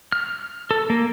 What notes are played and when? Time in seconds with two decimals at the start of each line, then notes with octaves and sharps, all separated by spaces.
0.12 F6
0.71 A4
0.90 A#3